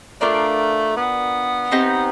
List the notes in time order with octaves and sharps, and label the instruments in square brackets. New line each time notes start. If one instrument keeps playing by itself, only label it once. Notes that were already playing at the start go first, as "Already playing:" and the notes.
[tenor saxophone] A3 [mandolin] D4 F4 A#4 D5
[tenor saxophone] B3
[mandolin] C4 D#4 G4